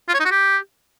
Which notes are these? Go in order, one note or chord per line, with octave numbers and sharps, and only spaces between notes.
F4
C#5
D#4
F#4
G4